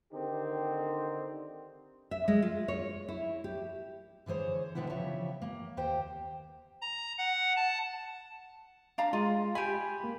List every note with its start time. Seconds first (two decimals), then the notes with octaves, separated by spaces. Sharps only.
0.13 D3 D#3 C4 D#4 G4
2.11 E5
2.28 G#3
2.42 F4
2.68 C#5
3.09 E4
3.44 G4
4.26 D3 E3 G#4 C5 C#5
4.75 B2 D3 D#3 G3 B3 E4
4.90 C#3 E3 F3 G4 C#5 E5
5.42 A#3
5.77 D#2 G4 C5 G5
6.81 A#5
7.18 F#5
7.56 A5
8.98 D4 F5 A#5
9.13 G#3 F4
9.55 G4 G#5 B5
10.04 A#3